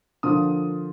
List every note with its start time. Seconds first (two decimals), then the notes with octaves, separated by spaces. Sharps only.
0.23 D3 F3 A#3 D4 F4 D#6